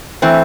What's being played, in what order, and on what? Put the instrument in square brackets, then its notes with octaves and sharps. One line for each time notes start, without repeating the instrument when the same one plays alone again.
[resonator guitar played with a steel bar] E3 A3 C4